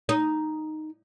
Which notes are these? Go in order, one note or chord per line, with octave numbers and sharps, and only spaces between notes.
D#4